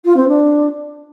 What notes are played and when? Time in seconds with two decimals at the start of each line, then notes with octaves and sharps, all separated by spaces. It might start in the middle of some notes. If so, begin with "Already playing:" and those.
0.04 F4
0.16 C4
0.28 D4